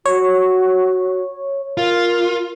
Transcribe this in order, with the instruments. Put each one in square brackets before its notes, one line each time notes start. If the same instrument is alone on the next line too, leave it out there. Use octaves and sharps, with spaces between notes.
[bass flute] F#4 [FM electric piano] C#5
[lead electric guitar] F4 [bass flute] A#4